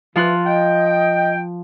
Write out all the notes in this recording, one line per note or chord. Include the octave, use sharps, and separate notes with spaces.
E3 F3 C6 F#6
D#5 G5